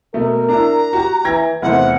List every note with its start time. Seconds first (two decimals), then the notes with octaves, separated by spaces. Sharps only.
0.14 B2 A3 A#4
0.49 D4 E4 A#5
0.93 F#4 G4
1.25 E3 G5 G#6 A#6
1.62 F1 E2 E4 C5 F#5